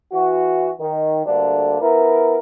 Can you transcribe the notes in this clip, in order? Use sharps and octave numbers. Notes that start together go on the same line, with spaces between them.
E3 F#4
D#3
D2 G2 D3 A#3 D4
B3 E4 A#4